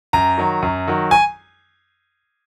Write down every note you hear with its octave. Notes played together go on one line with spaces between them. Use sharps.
F#2 A#5
D#3 F#3
F#2
D#3 F#3
G#5